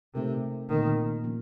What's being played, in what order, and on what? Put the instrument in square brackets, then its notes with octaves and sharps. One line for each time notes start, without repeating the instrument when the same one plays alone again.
[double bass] C3 [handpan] A3 D#4 A#4
[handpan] A#2 A3 C4 [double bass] D#3
[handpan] F3 A#3 C#4